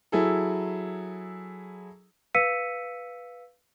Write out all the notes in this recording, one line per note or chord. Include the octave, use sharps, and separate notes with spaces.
F#3 E4 G#4 A4
B4 F5 E6 B6 C#7 D#7